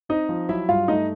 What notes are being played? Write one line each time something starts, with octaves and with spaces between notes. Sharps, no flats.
C4 D#4 D#5
F3
F#3 E4 E5
G2 F4 F5
A3 D#4 D#5